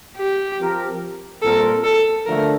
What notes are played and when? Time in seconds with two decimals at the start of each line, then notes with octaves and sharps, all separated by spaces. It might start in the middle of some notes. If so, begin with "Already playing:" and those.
0.17 G4
0.59 F3 C4 G4 A#4
1.43 A#2 G3 C4 F4 A4 A#4
1.84 A4
2.26 D3 F3 A3 A#4